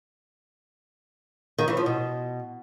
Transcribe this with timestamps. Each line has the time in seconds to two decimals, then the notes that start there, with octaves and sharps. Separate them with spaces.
1.58 D#3
1.68 E3
1.77 F3
1.86 B2